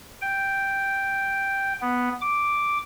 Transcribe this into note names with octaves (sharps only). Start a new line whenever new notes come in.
G5
B3
D6